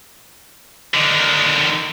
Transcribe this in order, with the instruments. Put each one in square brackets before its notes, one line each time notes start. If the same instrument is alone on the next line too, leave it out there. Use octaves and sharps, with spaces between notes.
[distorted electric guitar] D3 D#3